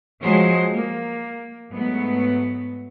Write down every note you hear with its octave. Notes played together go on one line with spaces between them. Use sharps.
F3 F#3 G#3 G#4 C5
A#3
G#2 F#3 A3 B3